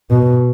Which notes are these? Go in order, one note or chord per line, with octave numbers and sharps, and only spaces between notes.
B2